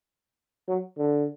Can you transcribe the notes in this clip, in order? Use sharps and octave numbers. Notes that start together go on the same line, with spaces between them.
F#3
D3